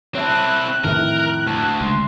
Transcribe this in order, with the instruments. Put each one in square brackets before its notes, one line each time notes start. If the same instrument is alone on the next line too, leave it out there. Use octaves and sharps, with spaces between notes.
[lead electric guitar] C4 E4 [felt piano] C#5 E5 A5 [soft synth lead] F#6
[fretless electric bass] F2 D#3 E3 [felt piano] A2 E5 [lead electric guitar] A#4
[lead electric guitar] D2 [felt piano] A5
[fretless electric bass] C#2 [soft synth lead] C6